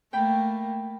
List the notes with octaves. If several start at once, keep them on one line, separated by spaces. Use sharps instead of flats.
A3 A#3 G5 B5